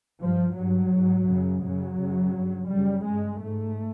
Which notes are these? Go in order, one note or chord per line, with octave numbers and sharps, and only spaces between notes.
G2 F3
G2 F#3
G#2
F#2 C#3
F#2 C#3 F#3
F#2 C#3
G2
F#2 C#3 G3
G2 G#3
G#2 A3